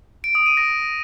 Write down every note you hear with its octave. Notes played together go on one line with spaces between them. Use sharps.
D7
D#6
D#7
A#6